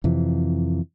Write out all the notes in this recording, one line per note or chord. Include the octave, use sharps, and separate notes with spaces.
F2 C3 E3